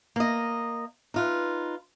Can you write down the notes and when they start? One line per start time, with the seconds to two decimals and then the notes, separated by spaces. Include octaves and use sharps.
0.16 A#3 D#5
1.14 D#4 F4 B4